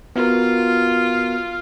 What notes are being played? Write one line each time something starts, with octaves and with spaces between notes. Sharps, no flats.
B3 F4 F#4 A#4